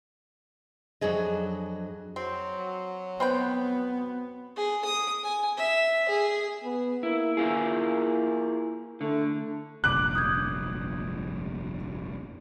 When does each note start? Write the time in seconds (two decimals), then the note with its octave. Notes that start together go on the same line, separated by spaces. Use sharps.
1.01 F2 F#3 D4 G#4 D#5
2.16 F#3 C4
3.20 B3 C4 B4 G5
4.56 G#4
4.85 D#6
5.23 G#5
5.57 E5
6.08 G#4
6.64 B3
7.03 A#3 E4
7.37 E4 F4 G#4
9.01 D3 A3
9.84 F1 A#1 G2 D6 F#6
10.15 D#6 G6 G#6